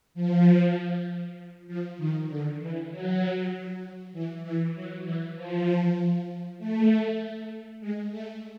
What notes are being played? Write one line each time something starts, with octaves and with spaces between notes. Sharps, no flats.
F3
F3
D#3
D3
E3
F#3
E3
E3
F#3
E3
F3
A3
G#3
A3